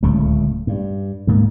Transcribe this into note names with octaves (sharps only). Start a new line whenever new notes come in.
D1 C#2 C#3 A3
G2
D2 G#2 A#3